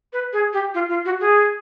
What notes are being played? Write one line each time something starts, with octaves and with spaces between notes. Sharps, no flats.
B4
G#4
G4
F4
F4
F#4
G#4